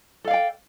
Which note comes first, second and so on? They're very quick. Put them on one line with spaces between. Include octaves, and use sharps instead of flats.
A4 F5 D5 G5